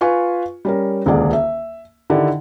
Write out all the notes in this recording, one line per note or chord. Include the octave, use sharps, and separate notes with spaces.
F4 B4 G#5 C#6
G3 C#4 A#4
D#1 C#2 D3 G#4 D5 F#5
E5
D3 D#3 E4 G4 D5